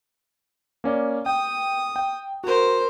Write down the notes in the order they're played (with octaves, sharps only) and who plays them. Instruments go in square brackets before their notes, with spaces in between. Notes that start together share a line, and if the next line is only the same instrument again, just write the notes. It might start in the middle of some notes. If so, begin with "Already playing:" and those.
[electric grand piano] A#3 C#4 D5
[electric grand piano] G5 [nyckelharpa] D#6
[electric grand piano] G5
[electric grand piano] F#4 [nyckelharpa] A#4 C5